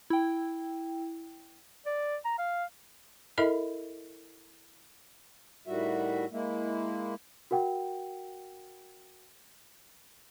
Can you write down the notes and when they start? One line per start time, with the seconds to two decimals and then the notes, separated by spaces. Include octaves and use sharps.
0.10 E4 G5
1.86 D5
2.24 A#5
2.39 F5
3.38 E4 A4 A#4 D#5 E5 B5
5.67 A2 D#3 G3 F#4 E5
6.32 G#3 A#3 E4
7.51 F#4 A#4 F#5 G5